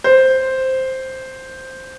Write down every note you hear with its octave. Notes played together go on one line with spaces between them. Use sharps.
C5